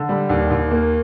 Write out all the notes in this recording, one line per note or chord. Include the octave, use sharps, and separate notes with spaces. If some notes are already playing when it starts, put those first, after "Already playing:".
Already playing: D3
G3
D#2
D#2
A#3